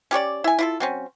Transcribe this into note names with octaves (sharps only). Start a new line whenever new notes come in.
C#4 G4 C#5 D5
E4 G#5
E4 F4 A4
F#3 C4 C#4